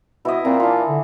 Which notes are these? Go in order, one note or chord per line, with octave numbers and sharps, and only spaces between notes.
B2 E4 D#5
A#2 C4 A#5
E3 D4 F4
D3